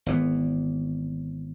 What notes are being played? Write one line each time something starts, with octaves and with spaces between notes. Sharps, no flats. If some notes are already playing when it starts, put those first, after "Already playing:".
G#1 E3 B3